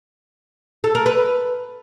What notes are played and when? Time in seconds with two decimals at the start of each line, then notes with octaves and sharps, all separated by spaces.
0.84 A4
0.95 A#4
1.06 B4